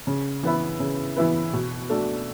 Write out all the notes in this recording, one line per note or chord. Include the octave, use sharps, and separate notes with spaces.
C#3
E3 B3 E4 B4
C#3
E3 B3 E4 B4
B2
A3 D4 F#4